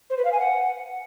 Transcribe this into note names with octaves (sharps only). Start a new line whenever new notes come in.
C5
B4
F5
G#5
F#5